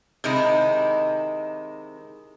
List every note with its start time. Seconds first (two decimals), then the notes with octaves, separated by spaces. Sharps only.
0.24 C3 D#3 G#3 D#4 E4